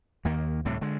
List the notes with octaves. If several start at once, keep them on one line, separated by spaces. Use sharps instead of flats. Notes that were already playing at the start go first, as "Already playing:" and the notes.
D#2 D#3 A#3
D2 A2 C3 G3
D3 G#3